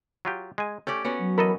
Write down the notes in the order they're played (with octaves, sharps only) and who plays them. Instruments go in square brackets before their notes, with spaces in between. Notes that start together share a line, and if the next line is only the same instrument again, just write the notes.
[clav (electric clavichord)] F#3 F4 G4
G#3 G#5
[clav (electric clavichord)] A3 [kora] C#4 G4 D5
[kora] B3 C#4 F#4
[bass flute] F#3
[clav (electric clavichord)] E3 A4 D#5 [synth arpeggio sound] A#4 B5